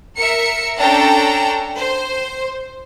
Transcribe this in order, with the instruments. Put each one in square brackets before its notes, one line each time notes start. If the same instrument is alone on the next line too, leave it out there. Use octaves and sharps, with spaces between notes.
[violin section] A#4 E5 C#7
C#4 D4 A4 G5 A#5
C5